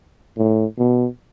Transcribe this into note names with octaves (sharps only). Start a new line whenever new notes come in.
A2
B2